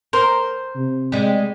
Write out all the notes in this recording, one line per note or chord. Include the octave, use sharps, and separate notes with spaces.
A#4 C5
C3
G3 G#3